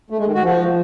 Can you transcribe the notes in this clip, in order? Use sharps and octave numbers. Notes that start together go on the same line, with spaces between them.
A3
G#3
D#3
F#4
F3